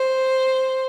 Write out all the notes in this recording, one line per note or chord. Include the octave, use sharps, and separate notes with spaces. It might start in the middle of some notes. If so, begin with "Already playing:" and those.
Already playing: C5